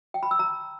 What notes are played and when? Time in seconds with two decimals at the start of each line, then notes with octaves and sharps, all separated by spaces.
0.14 G5
0.23 B5
0.31 E6
0.39 A#5